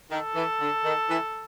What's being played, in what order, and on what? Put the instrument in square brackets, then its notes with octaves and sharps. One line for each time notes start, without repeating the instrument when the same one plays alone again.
[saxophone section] D#3 [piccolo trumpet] A4
[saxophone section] E3
D3
D#3
E3